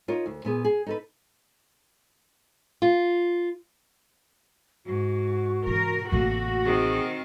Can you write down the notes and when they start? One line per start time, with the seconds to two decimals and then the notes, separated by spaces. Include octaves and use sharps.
0.08 D#4 F4 A#4 C#5
0.26 D2
0.45 A#2 B3 G#4
0.64 G#4
0.86 D#4 A4 B4
2.82 F4
4.86 G#2 F#4
5.67 C3 E3 A#4
6.12 A1 C3 A3 A#3 F#4
6.65 D#3 C4 G#4